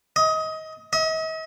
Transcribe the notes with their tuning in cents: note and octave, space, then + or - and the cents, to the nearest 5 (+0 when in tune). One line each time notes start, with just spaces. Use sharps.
D#5 +25
D#5 +45